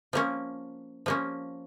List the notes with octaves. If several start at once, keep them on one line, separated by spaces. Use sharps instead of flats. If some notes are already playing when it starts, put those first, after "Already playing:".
F3 A#3 C#4
F3 A#3 C#4